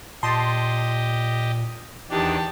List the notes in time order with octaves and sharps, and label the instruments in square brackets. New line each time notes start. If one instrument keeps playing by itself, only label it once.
[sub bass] A#2 [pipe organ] G4 D#5 [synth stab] A5 C6
[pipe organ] E2 D#3 D4 [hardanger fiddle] G4 A5